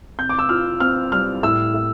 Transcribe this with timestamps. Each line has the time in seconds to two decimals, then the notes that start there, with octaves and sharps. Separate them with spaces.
0.19 C3 G6
0.29 D6
0.39 E6
0.49 F4 F6
0.80 C4 F6
1.12 G3 F6
1.43 A2 E6
1.74 A2